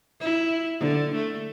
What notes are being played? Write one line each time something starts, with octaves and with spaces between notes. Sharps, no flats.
E4
D3
A3